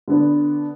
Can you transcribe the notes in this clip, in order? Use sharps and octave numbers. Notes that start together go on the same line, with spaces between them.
D3 B3 D4